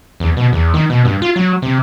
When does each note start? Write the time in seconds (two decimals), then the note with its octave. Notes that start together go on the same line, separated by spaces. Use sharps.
0.20 E2
0.37 B2
0.53 E2
0.74 D#3
0.90 B2
1.05 G2
1.22 F4
1.36 F#3
1.62 C3